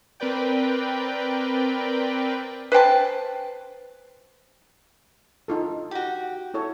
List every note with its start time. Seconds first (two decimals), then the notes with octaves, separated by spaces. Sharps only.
0.20 C4 A#4 B4 D5 G5
2.72 B4 C5 G5 A5
5.48 D#4 F4 A4
5.91 F#4 G4
6.54 E4 A4 C#5